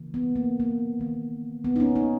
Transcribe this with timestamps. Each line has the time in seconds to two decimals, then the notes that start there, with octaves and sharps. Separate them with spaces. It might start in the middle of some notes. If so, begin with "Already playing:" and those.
Already playing: C#3 E3 A#3
0.14 B3
0.36 A#3
0.60 A#3
0.99 D#3 A#3
1.64 B3
1.76 D#4
1.80 C#4
1.96 D#4